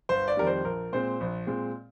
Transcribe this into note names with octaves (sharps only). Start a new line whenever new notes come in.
G1 C5
D5
F2 D#3 G3 A#4
C5
A#1 A#4
A#2 G#3 C4 C5
A#1
A#2 G#3 C4